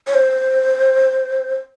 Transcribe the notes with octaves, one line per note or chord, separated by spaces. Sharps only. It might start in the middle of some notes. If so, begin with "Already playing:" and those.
C#5
C5